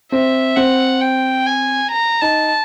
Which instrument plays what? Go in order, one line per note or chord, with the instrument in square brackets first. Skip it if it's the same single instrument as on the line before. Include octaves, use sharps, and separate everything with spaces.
[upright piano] C4 [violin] E5
[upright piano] C4 [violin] F#5
[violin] G5
G#5
A#5
[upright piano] D#4 [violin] A5